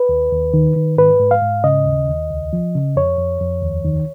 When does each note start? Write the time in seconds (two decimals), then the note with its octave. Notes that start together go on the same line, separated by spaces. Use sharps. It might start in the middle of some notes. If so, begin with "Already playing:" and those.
Already playing: B4
0.09 D#2
0.32 D#2
0.54 D#3
0.76 D#3
0.97 G#2 B4
1.20 G#2
1.31 F5
1.42 G#2
1.64 C#3 D#5
1.86 D#2
2.08 D#2
2.30 C#2
2.53 F3
2.75 C#3
2.96 F2 C#5
3.18 F2
3.41 F2
3.62 D#2
3.85 D#3